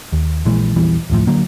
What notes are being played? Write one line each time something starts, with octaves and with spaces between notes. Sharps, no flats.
D#2
A#1 A#2 E3 G#3
A#1 E2 E3 G3
D1 F2 A2 F3
D3 F#3 A#3